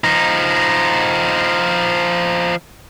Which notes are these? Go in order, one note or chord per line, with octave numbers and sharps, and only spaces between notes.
F3 D#4